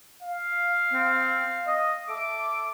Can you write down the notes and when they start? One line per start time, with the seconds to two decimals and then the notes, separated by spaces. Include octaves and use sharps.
0.23 F5
0.92 C4
1.66 D#5
2.09 A4 E5 D6